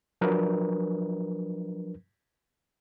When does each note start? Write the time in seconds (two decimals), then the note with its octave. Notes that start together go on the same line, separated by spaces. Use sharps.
0.21 F3 F#3 D4 A#4 B4